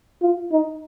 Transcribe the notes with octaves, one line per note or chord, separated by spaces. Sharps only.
F4
D#4